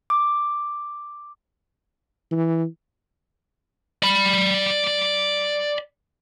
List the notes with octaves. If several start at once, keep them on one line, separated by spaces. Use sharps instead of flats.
D6
E3
D5 B5